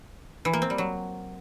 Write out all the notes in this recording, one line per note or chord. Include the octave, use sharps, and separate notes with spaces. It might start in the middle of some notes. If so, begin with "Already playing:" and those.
E3
A#3
C4
G3
F#3